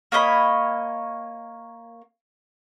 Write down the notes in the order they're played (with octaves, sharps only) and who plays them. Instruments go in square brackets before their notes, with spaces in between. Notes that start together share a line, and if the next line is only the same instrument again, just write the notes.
[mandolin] A#3 C#5 D#5 B5